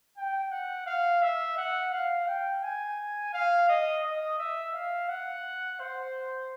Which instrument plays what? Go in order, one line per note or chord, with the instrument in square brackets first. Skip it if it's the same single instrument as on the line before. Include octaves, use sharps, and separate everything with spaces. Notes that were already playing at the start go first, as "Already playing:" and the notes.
[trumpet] G5
F#5
F5
E5
F#5
F5
G5
G#5
F5
D#5
D#5
E5
F5
F#5
C5